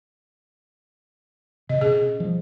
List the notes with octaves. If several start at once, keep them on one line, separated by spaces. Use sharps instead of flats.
C3 D#5
B2 C#4 G#4
F3 G3